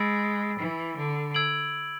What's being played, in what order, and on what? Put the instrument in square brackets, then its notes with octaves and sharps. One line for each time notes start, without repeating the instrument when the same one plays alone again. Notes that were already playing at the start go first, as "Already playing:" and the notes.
Already playing: [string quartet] G#3 [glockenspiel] B5 E6 A6 D7
[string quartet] E3
D3
[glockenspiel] E6 G#6 D7 F#7